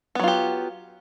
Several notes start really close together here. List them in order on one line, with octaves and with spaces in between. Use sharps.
B3 F#3 F4 G4